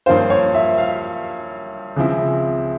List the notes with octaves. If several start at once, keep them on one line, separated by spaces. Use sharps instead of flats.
G2 F3 A#3 C#4 F4 C5
C#5
E5
F5
C#2 C#3 F3 C4 E4